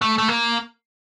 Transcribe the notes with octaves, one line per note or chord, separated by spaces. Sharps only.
A3
A3
A#3